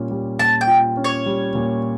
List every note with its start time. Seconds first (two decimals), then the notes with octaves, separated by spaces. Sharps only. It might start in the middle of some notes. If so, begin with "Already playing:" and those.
Already playing: A#2 G3 C#4 F4
0.11 G3
0.39 A#2 A5
0.61 G5
0.68 F4
0.97 C#4
1.04 C#5
1.26 G3
1.55 A#2